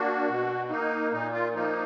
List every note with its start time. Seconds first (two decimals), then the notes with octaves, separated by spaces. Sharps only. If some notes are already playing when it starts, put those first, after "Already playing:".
Already playing: A#3 D4 F#4
0.29 B2
0.70 A#3 D#4
1.12 A#2 D#4
1.33 F4
1.54 F3 A#3 D#4